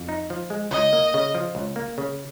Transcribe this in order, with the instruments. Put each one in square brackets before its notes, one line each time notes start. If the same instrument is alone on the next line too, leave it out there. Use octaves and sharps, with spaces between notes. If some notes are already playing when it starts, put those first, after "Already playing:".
Already playing: [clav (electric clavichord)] F2
D#4
F3
G#3
[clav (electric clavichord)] C#2 [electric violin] D#5
[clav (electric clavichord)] A#3
C#3
F3
C#2
A#3
C#3